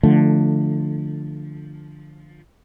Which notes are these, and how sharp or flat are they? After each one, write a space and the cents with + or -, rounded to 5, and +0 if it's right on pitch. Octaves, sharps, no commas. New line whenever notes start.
D3 +15 F3 +0 A3 +0